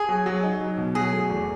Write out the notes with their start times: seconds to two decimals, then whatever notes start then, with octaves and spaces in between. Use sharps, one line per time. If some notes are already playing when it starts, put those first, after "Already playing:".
Already playing: G#4
0.09 F#3
0.26 F#3
0.43 D#4
0.61 F#3
0.77 B2
0.95 F#3 G#4
1.12 A3
1.30 E2